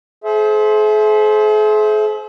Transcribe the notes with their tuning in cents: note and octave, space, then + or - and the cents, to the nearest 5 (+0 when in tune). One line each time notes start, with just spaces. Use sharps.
G#4 +45 C5 +5 E5 +0